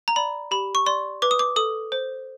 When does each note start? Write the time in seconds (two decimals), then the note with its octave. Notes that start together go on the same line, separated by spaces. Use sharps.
0.08 A#5
0.16 D5 B5
0.51 G4 B5
0.75 C#6
0.86 D5 C6
1.22 B4 D6
1.31 D#6
1.39 D6
1.56 A4 D#6
1.92 C5